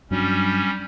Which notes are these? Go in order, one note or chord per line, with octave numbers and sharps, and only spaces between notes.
G2 F#3 G3 C#4 D4